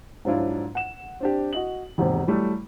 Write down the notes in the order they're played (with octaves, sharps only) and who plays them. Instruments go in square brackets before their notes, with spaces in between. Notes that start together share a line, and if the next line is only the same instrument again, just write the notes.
[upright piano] G#2 F3 F#3 D4 E4 F4
F#5 E7
C4 D4 G4
F#4 D#5 F#7
E1 D#2 G#2 C3
E3 F#3 G3 A3